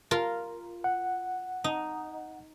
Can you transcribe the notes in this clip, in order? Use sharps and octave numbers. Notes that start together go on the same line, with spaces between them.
F4 A#4
F#5
D#4